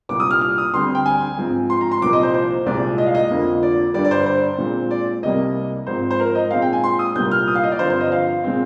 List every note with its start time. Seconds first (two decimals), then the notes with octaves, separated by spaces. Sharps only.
0.09 C2 A#2 G3 D6
0.20 D#6
0.31 F6
0.41 F6
0.58 D#6
0.74 D2 D3 G3 C4 C6
0.95 G5
1.06 G#5
1.38 G#2 F3 C4
1.70 C6
1.81 A#5
1.91 C6
2.02 C2 A#2 F3 D6
2.13 D#5
2.23 C5
2.34 C5
2.66 C2 A#2 G#3 C4 D5
2.98 D#5
3.06 F5
3.15 D#5
3.30 F2 D3 F3 A#3
3.63 D5
3.94 G2 D3 G3 D5
4.05 D5
4.11 C5
4.26 C5
4.58 A#2 G#3 C4
4.91 D5
5.23 C2 C3 G3 A#3 D#5
5.87 G#2 F3 C4 C5
6.11 C5
6.20 A#4
6.35 D#5
6.51 A#2 G#3 C4 F5
6.62 G5
6.73 G#5
6.84 C6
6.99 D#6
7.15 C2 A#2 G3 A#3 G6
7.31 F6
7.48 D#6
7.55 F5
7.64 D#5
7.72 D5
7.79 G2 D3 F3 C4 C5
7.90 C5
8.01 D#5
8.12 F5
8.44 A#2 G#3 C4